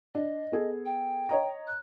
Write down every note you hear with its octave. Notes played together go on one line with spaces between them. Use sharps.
D4 D#5
B3 G#4 A4
G5
C#5 D#5 A#5
F#6